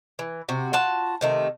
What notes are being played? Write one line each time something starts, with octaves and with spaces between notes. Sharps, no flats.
E3
C3 F#4
F4 F#4 A5
C3 D#3 A3